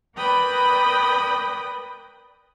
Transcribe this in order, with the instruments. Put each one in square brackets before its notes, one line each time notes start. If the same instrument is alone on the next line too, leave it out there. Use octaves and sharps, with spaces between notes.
[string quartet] A#4 B4 D5 G5 B5 D#6